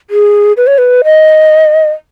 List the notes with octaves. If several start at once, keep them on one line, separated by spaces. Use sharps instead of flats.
G#4
B4
C#5
B4
D#5